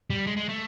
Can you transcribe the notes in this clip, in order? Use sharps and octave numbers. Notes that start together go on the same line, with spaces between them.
G3
G#3
G#3
A3